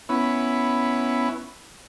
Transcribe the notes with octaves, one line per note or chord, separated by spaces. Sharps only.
B3 C#4 E4